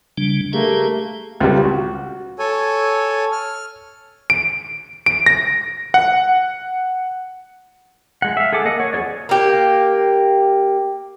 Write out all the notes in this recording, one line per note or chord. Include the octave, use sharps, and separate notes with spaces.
C#3 G3 D4
A3 A#3 G4 G#4
C#2 G3
F#4
A4 C#5 G#5
F6
D7
D7
A#6
F#5
G#3 F#5
E5 F5
G#4 A4 F#5 D6
A#3 D#5 F#5
C#5
G#4 A4 C#5 D5
A#3 G4